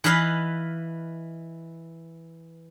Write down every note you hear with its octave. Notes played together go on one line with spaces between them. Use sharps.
E3 B4 D#5 F5 B5